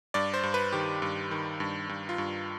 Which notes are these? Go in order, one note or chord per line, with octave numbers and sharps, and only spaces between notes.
G2 D5
C5
G2
B4
D#3 G4
G2
D#3
G2
G2
F4
G2